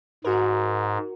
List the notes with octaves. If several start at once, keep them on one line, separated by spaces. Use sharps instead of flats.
G#2 F#4 A#4